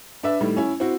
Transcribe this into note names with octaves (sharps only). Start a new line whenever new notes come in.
D4 B4 E5
A2 D#3 G3
C#4 E4
C4 E4 F#4